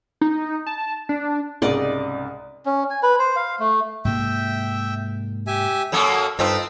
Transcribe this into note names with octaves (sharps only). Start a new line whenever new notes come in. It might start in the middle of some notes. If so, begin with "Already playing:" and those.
D#4
A5
D4
C2 G#2 C#3 D5 D#5
C#4
G#5
B4
C5
F5
A3
G#2 C3 A#3 E5 G5
G4 E5 G#5
F#2 F#3 A#3 A4
G2 C4 D#4 F4 A4 B4